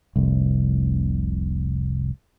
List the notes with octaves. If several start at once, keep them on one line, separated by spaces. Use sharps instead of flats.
F1 C2